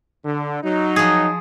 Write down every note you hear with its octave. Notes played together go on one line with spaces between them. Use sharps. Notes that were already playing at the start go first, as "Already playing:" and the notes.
D3
F#3 D#4
F3 G#4